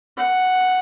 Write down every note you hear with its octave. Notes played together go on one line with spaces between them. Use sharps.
F#5